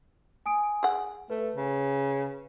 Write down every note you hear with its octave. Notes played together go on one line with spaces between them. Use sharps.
G#5 D#6 D7
G#4 F#5
A3 B4
C#3